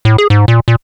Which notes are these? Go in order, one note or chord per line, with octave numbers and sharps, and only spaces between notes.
A2
G#4
G#2
A#2
A#2